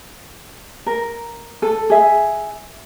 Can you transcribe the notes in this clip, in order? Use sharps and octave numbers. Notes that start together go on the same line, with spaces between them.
A#4
A4
G#4 E5